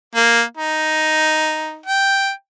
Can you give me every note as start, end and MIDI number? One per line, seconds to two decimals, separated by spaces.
0.15 0.42 58
0.57 1.81 63
1.86 2.30 79